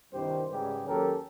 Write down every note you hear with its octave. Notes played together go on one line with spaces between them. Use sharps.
C2 G2 D#3 G4 C5
G#2 C#3 G3 G4 G#4 B4
D#2 F#3 C#4 G4 A4 A#4